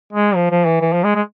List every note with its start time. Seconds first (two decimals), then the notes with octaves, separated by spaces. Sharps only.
0.13 G#3
0.35 F3
0.51 F3
0.66 E3
0.81 E3
0.93 F3
1.04 G#3
1.15 G#3